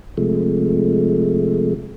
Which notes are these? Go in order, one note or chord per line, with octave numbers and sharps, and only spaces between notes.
C3 F3 G#3 A3